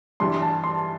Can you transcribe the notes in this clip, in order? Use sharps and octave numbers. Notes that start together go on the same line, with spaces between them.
G2 E3 G3 C6
A5
C6